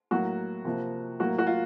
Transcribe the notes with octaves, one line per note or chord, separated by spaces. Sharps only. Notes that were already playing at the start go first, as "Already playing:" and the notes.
A2 F#3 A#3 F#4
C3 F3 A#3
A2 F#3 A#3 F#4
F#4
F4